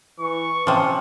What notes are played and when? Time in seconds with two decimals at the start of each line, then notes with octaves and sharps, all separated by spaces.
0.19 E3 C#6
0.67 C3 F3 C#4